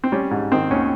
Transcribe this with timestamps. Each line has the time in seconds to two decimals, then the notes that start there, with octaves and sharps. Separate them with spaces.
0.04 C4
0.12 G3 C#4
0.31 G#2
0.52 D#3 C4
0.70 D#2 C#4